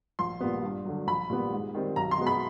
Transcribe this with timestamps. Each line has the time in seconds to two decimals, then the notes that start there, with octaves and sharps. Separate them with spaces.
0.19 A#1 C6
0.40 A#2 G3 B3
0.63 G2
0.85 D3 F#3
1.07 A#1 B5
1.30 A#2 G3 B3
1.52 G#2
1.74 D#3 G3 C4
1.96 B1 A#5
2.11 C6
2.18 B2 G#3 B3
2.27 B5